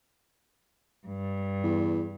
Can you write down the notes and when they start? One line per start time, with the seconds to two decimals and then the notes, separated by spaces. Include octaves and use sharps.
1.05 G2
1.63 E2